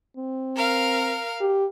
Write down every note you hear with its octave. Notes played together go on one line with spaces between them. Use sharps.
C4
A#4 F5
G4